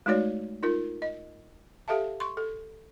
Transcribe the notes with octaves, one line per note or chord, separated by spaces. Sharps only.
G#3 A3 D#4 F#4 C#5 D5
D#4 F4 A#4
D#5
G4 A4 E5 F5 A5
C6 C#6
A4